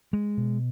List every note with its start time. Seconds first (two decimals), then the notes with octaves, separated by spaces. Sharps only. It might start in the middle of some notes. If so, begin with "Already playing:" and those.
0.13 G#3
0.37 B2